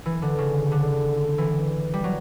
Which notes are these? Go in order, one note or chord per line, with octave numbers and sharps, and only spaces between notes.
E3
D3
C#3
D3
E3
G3
F#3